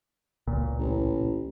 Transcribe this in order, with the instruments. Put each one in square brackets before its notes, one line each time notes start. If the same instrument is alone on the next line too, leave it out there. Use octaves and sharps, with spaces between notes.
[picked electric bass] C#2 A#2
[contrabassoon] A1